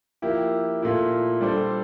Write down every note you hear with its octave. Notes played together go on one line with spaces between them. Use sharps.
F3 A#3 E4 G4
A#2 A3 E4
G3 D4 A4 C5